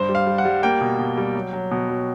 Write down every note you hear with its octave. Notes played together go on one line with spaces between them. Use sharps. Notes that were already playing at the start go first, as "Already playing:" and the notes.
Already playing: G2 C5
G3
F5
G3
F#5
G3
A#3 G5
B2
B2
G3
F#3
F#3
B2
F#3